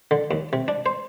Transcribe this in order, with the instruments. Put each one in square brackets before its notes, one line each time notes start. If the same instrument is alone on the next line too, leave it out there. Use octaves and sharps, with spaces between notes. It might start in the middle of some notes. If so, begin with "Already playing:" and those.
[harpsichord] D3
D#2
C3
D4
C5